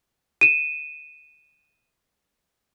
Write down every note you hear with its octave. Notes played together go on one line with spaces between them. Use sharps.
D#7 E7